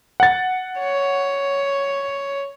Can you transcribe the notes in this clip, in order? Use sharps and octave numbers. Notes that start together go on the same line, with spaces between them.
F#5 A6
C#5